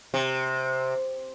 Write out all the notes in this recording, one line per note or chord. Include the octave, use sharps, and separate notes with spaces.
C3